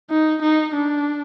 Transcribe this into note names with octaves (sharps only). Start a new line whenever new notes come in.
D#4
D#4
D4